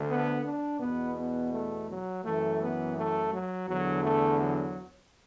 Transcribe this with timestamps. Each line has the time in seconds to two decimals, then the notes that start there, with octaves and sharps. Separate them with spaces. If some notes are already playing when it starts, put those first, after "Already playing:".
Already playing: D2 D3
0.08 B3
0.43 D4
0.79 E2 B2 B3
1.15 B3
1.51 A3
1.87 F#3
2.23 F#2 E3 A3
2.60 B3
2.96 A3
3.31 F#3
3.67 E2 D3 F#3
4.02 A3
4.38 F#3